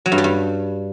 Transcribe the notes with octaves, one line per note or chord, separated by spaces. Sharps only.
F#3
G2
G3
G2